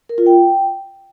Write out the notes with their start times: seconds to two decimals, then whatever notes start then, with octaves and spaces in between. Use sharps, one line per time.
0.09 A#4
0.18 F4
0.26 G5